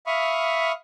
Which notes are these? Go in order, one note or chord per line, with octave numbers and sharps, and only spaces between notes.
E5 F5 B5 C#6 D#6 F6